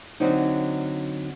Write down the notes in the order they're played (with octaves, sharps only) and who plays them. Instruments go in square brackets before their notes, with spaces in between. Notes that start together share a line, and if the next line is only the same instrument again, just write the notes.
[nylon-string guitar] D3 F#3 C4 C#4 D#4